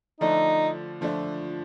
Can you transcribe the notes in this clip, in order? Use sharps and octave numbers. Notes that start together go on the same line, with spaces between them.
D3 F3 A3 D4 D#4
D3 F3 A3 D4